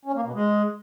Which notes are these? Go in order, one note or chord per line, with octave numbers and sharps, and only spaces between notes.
C#4
A#3
B2
G#3